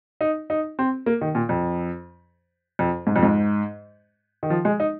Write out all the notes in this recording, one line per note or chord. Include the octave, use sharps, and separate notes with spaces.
D#4
D#4
C4
A#3
D#3
A#2
F2
F2
G#2
F2
G#2
D#3
F3
G#3
D#4